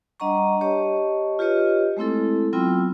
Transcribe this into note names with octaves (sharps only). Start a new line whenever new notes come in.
G3 D4 D#5 F#5 A#5 C#6
G4 C#5 D#5 A5 C#6
F4 G4 B4 C#5 D#5
G#3 A3 C4 E4 A4
F#3 B3 C4 F4 G5 E6